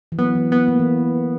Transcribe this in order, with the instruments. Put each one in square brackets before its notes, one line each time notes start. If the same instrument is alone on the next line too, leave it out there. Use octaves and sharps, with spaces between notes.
[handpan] E3
[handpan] F#3 [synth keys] B3
[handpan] E3
[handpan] F#3 [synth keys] B3
[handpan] A#3
E3